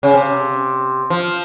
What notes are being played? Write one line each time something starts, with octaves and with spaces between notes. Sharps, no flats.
C#3
C3
F3